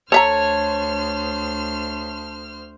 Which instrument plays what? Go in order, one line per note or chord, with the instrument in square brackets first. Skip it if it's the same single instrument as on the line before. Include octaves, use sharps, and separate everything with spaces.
[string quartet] D2 C5 F6 [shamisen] A4 E5 A#5 [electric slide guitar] C#5 [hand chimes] A5